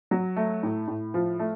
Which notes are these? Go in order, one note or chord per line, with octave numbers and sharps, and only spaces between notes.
F#3
A3
A2
A2
F3
A3